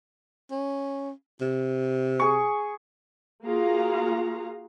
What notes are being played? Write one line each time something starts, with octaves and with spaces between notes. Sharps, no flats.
C#4
C3
G#4 C#6
A#3 F4 F#4 G#4 F5 A#5